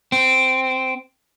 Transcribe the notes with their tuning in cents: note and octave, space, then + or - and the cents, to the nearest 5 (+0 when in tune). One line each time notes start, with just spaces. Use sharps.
C4 -10